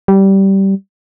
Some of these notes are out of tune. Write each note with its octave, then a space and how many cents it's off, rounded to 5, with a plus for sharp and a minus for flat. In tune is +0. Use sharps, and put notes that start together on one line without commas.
G3 -15